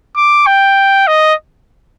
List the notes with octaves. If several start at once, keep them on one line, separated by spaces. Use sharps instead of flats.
D6
G5
D#5